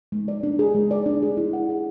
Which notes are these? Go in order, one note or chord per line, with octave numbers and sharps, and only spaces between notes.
G#3
D5
D4
G#4
G#3
D5
D4
G#4
E4
F#5
G#4